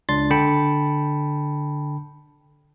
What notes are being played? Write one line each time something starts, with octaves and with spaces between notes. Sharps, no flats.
C#2 D4 C6 A6
D3 G5 A5 B5 C#7